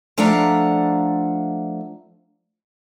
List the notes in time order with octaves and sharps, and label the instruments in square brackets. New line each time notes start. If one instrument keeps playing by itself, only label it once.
[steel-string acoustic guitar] F3 A3 D4 F5 F#5 A#5